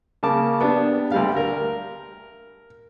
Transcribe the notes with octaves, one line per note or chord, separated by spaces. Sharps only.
C#3 A#3 A5 D6
B3 D4 G4
D2 G3 F5
A#4